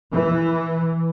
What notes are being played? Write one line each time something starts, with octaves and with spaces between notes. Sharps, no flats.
E3